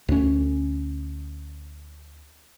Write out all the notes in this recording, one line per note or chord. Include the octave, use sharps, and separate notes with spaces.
D2 C#4